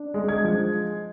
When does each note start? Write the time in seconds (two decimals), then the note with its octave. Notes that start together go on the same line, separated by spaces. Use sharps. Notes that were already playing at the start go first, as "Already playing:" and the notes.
Already playing: D4
0.14 G#3
0.29 G#6
0.45 F3